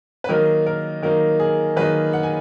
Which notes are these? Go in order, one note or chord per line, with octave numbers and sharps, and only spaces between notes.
B4
D#3 F#3 A#3 D#4 A#4
A#4
D#3 F#3 A#3 D#4 A#4
G#4
D#3 F#3 A#3 D#4 B4
F#5
G#5